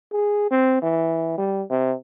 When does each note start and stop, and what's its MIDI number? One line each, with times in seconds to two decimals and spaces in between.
0.12 0.48 68
0.51 0.80 60
0.82 1.35 52
1.38 1.63 55
1.70 1.93 48